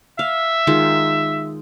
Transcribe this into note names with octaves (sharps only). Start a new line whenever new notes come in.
E5 F5
D#3 G#3 F4